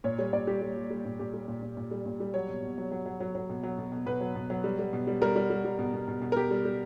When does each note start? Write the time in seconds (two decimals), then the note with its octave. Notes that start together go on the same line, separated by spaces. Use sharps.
0.04 A#2 C#5
0.18 G3 C#5
0.33 A#2 D5
0.47 G3 G4
0.62 G3
0.76 G3
0.91 G3
1.05 A#2
1.19 A#2 G4
1.34 G3
1.48 A#2
1.62 A#2
1.77 A#2
1.91 G3
2.06 A#2
2.20 G3
2.34 F#3 C#5
2.48 B2
2.63 B2
2.78 F#3
2.91 F#3
3.06 F#3
3.20 F#3
3.35 F#3
3.49 B2
3.63 F#3
3.78 B2
3.92 B2
4.06 B2 B4
4.21 F#3
4.35 B2
4.50 F#3
4.64 G3
4.79 G3
4.93 B2
5.07 G3
5.22 G3 A#4
5.36 G3
5.50 G3
5.65 G3
5.79 B2
5.93 B2
6.08 B2
6.22 B2
6.32 A#4
6.36 B2 G4
6.51 G3
6.65 G3